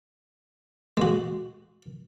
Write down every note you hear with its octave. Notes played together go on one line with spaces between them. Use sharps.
G#3 F#4